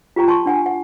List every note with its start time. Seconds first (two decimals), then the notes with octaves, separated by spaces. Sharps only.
0.16 F4 G4 G5 A#5
0.28 A5 C6 C#6
0.46 D4 F#5 G#5
0.66 F#5